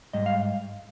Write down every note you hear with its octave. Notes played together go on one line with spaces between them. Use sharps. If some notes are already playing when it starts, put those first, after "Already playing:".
G#2 G3 D#5
F5